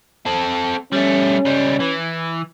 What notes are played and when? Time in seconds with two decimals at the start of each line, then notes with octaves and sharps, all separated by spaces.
0.26 C4 A4
0.93 G3 A3 C#4
1.45 C#2 G3
1.80 E3